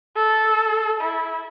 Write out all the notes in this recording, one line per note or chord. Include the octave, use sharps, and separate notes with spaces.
A4
E4